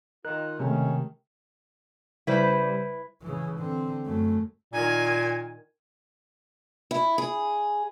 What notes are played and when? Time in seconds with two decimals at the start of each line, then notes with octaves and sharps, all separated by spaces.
0.25 D#3 F4 A#4 F#6
0.59 C3 D#3 G#3 A3 C#4
2.27 C#3 G3 E4 B4 C5
3.22 C#3 E3
3.59 D3 C4
4.05 F#2 A3
4.74 A#2 D#3 G#5
6.91 E4
7.18 G#4